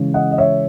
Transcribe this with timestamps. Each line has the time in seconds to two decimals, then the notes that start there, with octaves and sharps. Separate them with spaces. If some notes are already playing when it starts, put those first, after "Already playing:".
Already playing: C#3 E3 G#3 C#4
0.14 D#5 F#5
0.31 D#5
0.38 C#5 E5